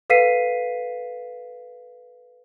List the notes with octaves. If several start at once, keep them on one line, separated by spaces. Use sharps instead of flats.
A4 B4 F5 B6 C7 D#7